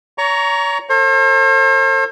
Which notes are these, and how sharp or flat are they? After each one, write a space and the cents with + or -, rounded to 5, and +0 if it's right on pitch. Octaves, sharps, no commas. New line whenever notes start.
C#5 +40 A#5 +0 C#6 +20
A4 +35 C5 +45